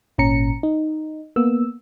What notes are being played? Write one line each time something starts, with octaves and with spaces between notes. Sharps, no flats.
G#1 A#2 C#4 A#5 C#7
D#4
A#3 B3 E6